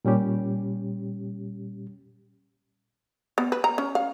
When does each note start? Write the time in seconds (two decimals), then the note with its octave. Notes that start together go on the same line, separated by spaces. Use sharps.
0.05 A#2 G3 C#4 G4
3.38 B3
3.52 B4
3.64 A#5
3.78 C#4
3.95 F5